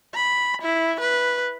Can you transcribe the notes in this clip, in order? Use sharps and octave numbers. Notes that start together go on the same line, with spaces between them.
B5
E4
B4